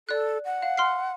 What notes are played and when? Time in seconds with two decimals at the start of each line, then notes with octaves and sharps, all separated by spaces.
0.09 A4 D5 F#6
0.45 F#5
0.62 F5
0.77 C6 F6 C7